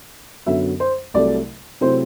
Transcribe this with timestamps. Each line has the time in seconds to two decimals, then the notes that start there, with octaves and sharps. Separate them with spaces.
0.46 F#2 D3 F#3 B3 E5
0.80 C5
1.14 C2 C3 F#3 A3 D5
1.81 C3 F#3 A3 C4 E4 C5